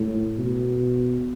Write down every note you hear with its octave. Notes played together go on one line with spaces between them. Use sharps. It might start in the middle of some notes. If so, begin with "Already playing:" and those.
Already playing: A2
B2